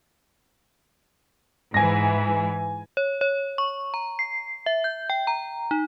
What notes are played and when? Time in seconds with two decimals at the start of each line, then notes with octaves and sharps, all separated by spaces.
1.74 G#2 E3 G#5 A#6
2.97 C#5
3.21 C#5
3.58 C#6
3.94 A#5
4.19 C7
4.66 E5
4.84 G6
5.10 G5
5.27 A#5
5.71 D#4